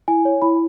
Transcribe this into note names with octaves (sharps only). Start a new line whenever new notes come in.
E4 G#5
C#5
E4 B5